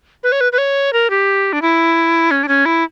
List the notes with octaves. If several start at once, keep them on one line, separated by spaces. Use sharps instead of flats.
B4
C#5
B4
B4
C#5
A#4
G4
D4
E4
C#4
D4
C#4
E4